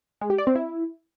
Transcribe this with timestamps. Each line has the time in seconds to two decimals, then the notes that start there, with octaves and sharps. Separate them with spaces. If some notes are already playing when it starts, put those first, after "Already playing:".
0.21 G#3
0.30 G4
0.38 D5
0.47 C4
0.55 E4